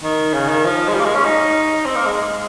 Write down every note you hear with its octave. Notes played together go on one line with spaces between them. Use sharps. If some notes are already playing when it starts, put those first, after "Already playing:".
D#3
C#3
D#3
F3
G#3
G3
A#3
G#3
C#4
D#4
C4
A#3
G#3